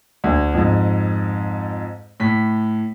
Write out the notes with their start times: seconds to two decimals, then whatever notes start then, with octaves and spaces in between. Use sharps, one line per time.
0.24 D2
0.54 F2 G#2
2.20 A2 B6